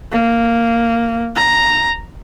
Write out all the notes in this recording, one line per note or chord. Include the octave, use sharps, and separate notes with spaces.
A#3
A#5